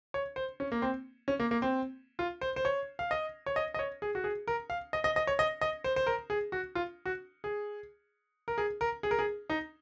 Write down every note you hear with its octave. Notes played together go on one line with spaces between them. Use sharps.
C#5
C5
C#4
A#3
C4
C#4
A#3
A#3
C4
F4
C5
C5
C#5
F5
D#5
C#5
D#5
D#5
C#5
G#4
F#4
G#4
A#4
F5
D#5
D#5
D#5
C#5
D#5
D#5
C5
C5
A#4
G#4
F#4
F4
F#4
G#4
A#4
G#4
A#4
G#4
A#4
G#4
D#4